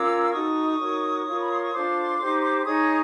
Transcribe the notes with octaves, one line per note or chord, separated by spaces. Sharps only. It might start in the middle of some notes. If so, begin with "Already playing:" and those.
Already playing: C#4 F4 A#4 D6 E6
D#4 F#4 A4 C#6 D#6
D#4 F#4 A#4 C#5
F4 A#4 C#5
B5
C6
C#6
D4 F4 A4 C5 C6 D6
D#4 G4 C5
D#4 G#4 C#5 C#6 D#6